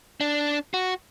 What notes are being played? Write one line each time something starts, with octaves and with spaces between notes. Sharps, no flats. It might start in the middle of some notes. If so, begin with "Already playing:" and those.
D4
F#4